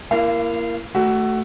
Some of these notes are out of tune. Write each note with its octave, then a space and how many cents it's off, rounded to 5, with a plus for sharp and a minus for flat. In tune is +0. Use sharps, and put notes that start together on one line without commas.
A#3 +0 E4 +30 F5 -25
A3 +0 F#4 +20